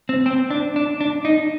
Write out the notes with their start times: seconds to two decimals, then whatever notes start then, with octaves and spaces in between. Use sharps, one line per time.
0.09 C4
0.26 C4
0.51 D4
0.76 D4
1.01 D4
1.25 D#4